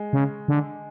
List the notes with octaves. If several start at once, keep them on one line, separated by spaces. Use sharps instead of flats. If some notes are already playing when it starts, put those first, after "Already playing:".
Already playing: G#3
C#3
D3